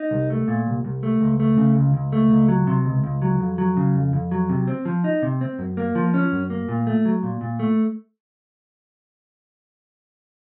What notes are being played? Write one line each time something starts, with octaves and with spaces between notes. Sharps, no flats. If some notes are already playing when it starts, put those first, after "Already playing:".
Already playing: D#4
C2
A3
A#2
C2
C2
A3
C#2
A3
C#3
C#2
C#2
A3
C#2
F#3
C3
C#2
C#2
F#3
F2
F#3
C#3
F2
F2
F#3
C3
C4
F3
D#4
C3
C4
F#2
A#3
F3
C#4
F#2
A#3
A#2
A3
F#3
A#2
A#2
A3